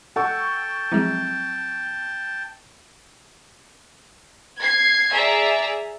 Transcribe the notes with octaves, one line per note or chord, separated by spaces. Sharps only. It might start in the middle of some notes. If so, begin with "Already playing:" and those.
A4 F#5 G5 A5 C#6
F3 F#3 G#3 C4 E4
G#6 C7
G#4 D5 E5 A#5